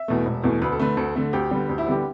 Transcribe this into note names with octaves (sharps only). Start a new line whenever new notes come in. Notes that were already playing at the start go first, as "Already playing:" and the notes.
Already playing: E5
E2 B2 A3
E1
E2 B2 A3
D2 B4
A4
D3 A3 B4
D2 A4
D3 A3
D2 G4
D3 G3 B3
D2
E4
D3 G3 B3 G4